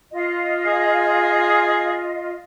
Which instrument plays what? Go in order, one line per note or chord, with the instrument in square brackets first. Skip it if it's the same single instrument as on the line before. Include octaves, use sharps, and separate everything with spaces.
[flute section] F4 D#5
[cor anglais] G#4